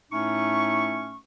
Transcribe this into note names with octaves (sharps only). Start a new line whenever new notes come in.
A2 A3 C#4 D#4 C#6